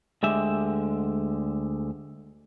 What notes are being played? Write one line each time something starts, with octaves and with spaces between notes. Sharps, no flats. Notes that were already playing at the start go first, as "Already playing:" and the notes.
D2 D3 G#3 G4 E5